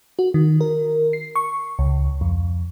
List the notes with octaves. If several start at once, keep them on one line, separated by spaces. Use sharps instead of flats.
F#4
D#3
A#4
C7
C#6
C#2
F2